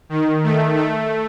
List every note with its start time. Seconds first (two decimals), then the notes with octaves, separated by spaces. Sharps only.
0.09 D#3
0.43 A3
0.76 A3